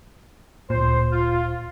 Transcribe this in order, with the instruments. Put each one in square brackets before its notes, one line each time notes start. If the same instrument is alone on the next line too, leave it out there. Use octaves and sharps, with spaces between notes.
[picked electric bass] D1 A#2 [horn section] C5
[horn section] F4